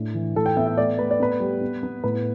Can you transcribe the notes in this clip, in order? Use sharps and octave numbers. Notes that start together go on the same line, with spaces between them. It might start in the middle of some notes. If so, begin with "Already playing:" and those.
Already playing: A2 D4
E3
A2 A4
G5
B3 E5
E5
A3 D5
A3 B4
D5
B3 B4
G3
B3
B3
A2 B4